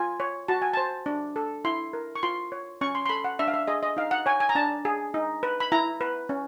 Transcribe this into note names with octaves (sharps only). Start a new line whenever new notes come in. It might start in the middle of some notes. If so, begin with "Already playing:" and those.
Already playing: F4 G#5
C#5
F#4 A5
G#5
C5 A5
D4
A4
E4 C6
A#4
C#6
F4 C6
C#5
C#4 C#6
C6
C6
A4 B5
F#5
D4 E5
F5
E5
G#4 D#5
D#5
D#4 F5
F#5
C#5 G#5
G#5
A#5
D4 A5
G#4
D#4
B4
B5
E4 A#5
B4
C#4